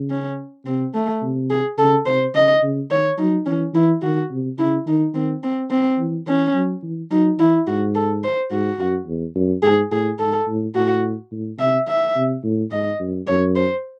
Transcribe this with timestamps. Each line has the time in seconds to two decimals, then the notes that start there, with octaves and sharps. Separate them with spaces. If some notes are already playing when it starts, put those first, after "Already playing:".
Already playing: C#3
0.10 C#4
0.66 C3 C4
0.94 A3
1.22 C3
1.50 G#4
1.78 C#3 A4
2.06 C3 C5
2.35 C#3 D#5
2.62 C#3
2.91 D#3 C#5
3.18 F#3 D#4
3.46 E3 C#4
3.74 E3 E4
4.02 D#3 F#4
4.31 C3
4.58 C#3 E4
4.87 D#3 D#4
5.14 D#3 C4
5.43 C4
5.71 C4
5.99 E3
6.27 E3 C#4
6.54 F#3
6.83 E3
7.11 F#3 D#4
7.39 E3 E4
7.67 G#2 F#4
7.95 A4
8.24 C5
8.51 G#2 F#4
8.78 F#2
9.07 E2
9.35 F#2
9.63 G#2 G#4
9.91 A2 G#4
10.19 G#2 A4
10.47 A2
10.75 A2 F#4
11.32 A2
11.59 C3 E5
11.88 E5
12.16 C3
12.44 A2
12.71 G#2 D#5
13.00 F#2
13.27 F#2 C#5
13.56 C5